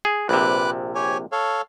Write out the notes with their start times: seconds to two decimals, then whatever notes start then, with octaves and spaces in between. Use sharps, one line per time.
0.05 G#4
0.29 A#1 C3 B4 D6 F#6
0.95 G4 C#5 G#5
1.32 A4 C#5 F5